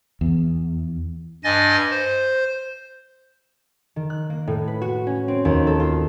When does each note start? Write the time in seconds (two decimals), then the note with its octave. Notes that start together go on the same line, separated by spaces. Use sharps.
0.21 E2
1.44 G2 D#5 G#5 A6
1.90 C5
3.96 D#3
4.10 F#6
4.30 A#3
4.47 A2
4.67 B4
4.82 F#4
5.07 C#4
5.28 C4
5.45 D#2
5.67 A4
5.80 F4